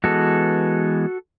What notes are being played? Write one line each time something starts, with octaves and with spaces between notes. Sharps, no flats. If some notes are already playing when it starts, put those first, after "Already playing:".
E3 G#3 B3 F#4 A4